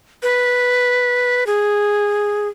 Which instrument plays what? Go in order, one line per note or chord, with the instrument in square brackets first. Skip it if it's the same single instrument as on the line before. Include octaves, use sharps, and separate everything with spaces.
[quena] B4
G#4